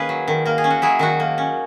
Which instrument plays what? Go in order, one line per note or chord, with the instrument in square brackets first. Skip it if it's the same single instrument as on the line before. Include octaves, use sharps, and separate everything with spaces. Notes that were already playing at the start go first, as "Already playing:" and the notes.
Already playing: [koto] D#3 A#3 C#4 G#4 B4
F#3
D#3
A#3 A#4
G#4
C#4
F#4
F#3 E4 G#4
D#3 D#4 F#4
A#3
C#4